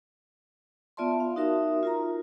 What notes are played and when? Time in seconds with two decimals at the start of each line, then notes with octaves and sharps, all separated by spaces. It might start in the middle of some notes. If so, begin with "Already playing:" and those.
0.97 B3 F4 D5 E5 A5 C6
1.20 F5
1.36 D#4 F#4 A#4 E5
1.83 F4 A#4 A#5